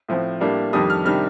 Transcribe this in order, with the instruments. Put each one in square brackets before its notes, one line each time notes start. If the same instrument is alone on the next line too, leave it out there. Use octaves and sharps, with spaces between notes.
[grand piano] A2 F3 C4
A2 G3 A#3 D4
F2 D#3 G3 D4 D#6
F6
C3 D#3 G3 D4 F6